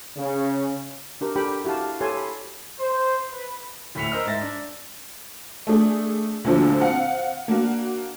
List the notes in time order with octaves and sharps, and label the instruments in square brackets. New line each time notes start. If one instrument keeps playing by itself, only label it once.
[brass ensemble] C#3
[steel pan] D4 G4 A#4
D4 G4 A4 G5 B5
E4 F#4 G4 F5 A5
G4 A4 C#5 G#5 A5 C6
B5
[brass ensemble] C5
B4
[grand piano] D2 A2 E5 B6 C#7 F7
A#4 C5 D#5 E6 F6
G#2 E5 A6 A#6
D4
[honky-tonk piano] A3 D4 G#4
D2 A#2 D3 F3 F#3
C4 F5 F#5
A#3 D4 F#4